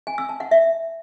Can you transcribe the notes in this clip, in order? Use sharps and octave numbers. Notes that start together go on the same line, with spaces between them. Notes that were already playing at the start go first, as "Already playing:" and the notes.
G#5
E6
A5
F#5
E5